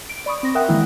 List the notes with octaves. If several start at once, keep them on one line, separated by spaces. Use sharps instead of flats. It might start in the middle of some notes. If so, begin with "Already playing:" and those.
D7
D5 B5 C#6 D#6
C4 A#6
A#4 E5 F#5 G5 D#6 F#6
D#3 E3 G#3 A#3 E4